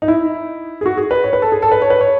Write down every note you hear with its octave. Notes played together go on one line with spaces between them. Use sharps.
D#4
E4
G#4
F#4
G#4
B4
C#5
B4
A4
G#4
A4
B4
C#5
B4
C#5